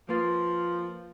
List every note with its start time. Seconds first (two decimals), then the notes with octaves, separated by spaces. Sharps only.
0.09 F3 A#3 F4 B4 C6 A6